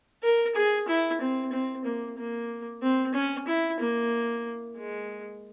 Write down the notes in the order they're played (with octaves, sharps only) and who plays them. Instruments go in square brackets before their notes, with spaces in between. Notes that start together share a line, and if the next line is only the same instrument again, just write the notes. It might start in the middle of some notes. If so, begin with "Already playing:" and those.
[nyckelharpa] A#4
G#4
E4
C4
C4
A#3
A#3
C4
C#4
E4
A#3
G#3